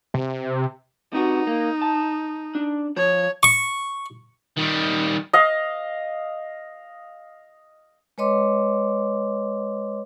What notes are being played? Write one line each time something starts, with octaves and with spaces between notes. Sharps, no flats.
C3
C3 B3 D#4 F#4
A#3
A5
D4
F3 C#5
C#6
D#3 G3
D#5 F5
G#3 B4 C#5 D#5 C6 D6